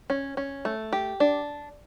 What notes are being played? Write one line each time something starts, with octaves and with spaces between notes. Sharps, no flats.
C#4
C#4
A3
G4
D4